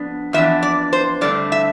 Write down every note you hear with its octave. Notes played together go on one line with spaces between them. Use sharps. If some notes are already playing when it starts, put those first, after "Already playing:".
Already playing: F2 B3 D4
F2 E3 B3 D4 E5
D5
C5
G2 D3 A3 C4 D5
E5